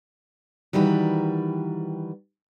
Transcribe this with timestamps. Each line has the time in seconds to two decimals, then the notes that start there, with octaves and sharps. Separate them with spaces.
0.73 D#3 E3 G3 F#4 A#4 B4